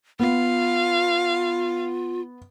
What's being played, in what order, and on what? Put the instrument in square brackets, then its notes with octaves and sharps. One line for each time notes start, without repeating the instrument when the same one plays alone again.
[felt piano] B3 [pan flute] F4 [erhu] F5